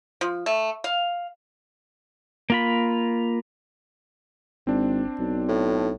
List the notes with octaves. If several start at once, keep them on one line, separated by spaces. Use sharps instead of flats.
F3
A3
F5
A#3 F4 B5
G#1 C4 D4
B1
A2